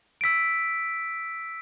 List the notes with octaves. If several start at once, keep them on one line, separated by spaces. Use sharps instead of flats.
E6 B6 D7